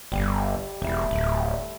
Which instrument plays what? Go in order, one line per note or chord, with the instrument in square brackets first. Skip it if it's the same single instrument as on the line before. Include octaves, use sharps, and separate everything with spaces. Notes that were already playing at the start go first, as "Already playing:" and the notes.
[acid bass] G1 [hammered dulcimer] G3
[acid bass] E1 [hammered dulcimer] A3 E4
[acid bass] D1